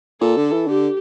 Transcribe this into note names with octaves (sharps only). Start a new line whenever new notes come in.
A#2 A4
D3
E3
D3 G4